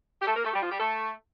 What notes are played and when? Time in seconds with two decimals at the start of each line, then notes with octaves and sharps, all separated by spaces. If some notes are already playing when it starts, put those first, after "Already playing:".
0.22 G4
0.27 A3 A4
0.36 A#3 A#4
0.44 A3 A4
0.53 G3 G4
0.62 F3 F4
0.71 G3 G4
0.80 A3 A4